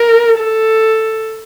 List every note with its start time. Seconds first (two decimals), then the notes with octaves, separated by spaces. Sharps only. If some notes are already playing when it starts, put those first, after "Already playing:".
Already playing: A#4
0.38 A4